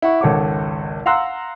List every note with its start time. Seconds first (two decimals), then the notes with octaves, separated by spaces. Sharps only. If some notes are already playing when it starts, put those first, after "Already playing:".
0.02 E4 F#5 C#6
0.21 G#1 C#2 A4 C#5 F#5 D6
1.06 F5 F#5 A#5 C6 E6 F#6